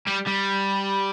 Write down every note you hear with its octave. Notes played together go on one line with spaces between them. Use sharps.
G3
G3